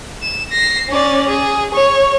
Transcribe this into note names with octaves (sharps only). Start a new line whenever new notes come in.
E7
A#6 C7
C#4 D5
G#4
C#5